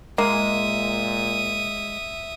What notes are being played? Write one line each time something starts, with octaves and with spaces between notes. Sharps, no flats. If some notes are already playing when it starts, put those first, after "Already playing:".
A#2 G#3 A#3 E5 D#6